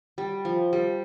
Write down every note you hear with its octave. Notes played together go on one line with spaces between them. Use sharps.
G3
F3
G3